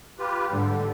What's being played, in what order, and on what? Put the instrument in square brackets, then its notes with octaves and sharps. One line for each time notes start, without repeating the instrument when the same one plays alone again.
[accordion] F4 G4 B4
[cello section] G#2 G3 [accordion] D3